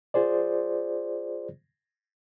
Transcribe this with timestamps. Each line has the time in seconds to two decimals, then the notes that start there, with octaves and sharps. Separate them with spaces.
0.14 F4 G#4 C5 D5